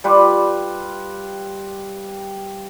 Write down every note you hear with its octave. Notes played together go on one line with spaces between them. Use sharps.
G3 F4 G4 B4